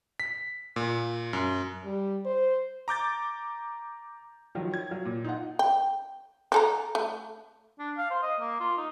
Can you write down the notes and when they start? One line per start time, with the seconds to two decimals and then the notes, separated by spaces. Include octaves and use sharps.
0.20 B6
0.76 A#2
1.33 F#2
1.85 G3
2.25 C5
2.88 A#5 D6 G6 A6
4.55 D#3 F3 F#3
4.74 G#6
4.91 F#3
5.05 A#2
5.24 D#4 F4 F#5
5.59 G5
6.52 C4 A4 A#5
6.95 A3
7.79 D4
7.97 F5
8.11 C5
8.23 D#5
8.40 A#3
8.60 F4
8.77 D#4